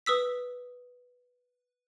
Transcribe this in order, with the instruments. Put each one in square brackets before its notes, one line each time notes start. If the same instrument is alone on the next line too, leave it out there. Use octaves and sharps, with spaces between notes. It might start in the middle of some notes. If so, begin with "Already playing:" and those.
[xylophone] B4 D#6 E6 B6